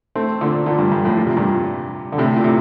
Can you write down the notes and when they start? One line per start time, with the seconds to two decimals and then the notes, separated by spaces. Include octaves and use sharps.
0.15 A3 C4
0.41 A#2 D3
0.66 A#2 D3
0.79 G2
0.92 G2
1.04 F2 A2
1.17 A#2
1.27 C3
1.37 G2 A#2
2.12 D3
2.18 A2 C3
2.36 A#2
2.44 A2 C3